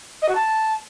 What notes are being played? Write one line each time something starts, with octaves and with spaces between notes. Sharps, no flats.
D#5
F#4
A5